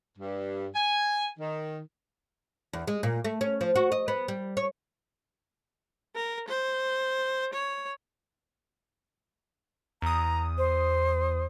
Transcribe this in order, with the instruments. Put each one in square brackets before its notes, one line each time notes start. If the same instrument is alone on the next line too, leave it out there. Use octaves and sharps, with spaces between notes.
[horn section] G2
G#5
D#3
[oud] E2
G#3
A#2
A3
C#4
F3
F#4
D#5
B3
G3
C#5
[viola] A#4
C5
C#5
[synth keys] E2 D#6 [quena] A#5
[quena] C5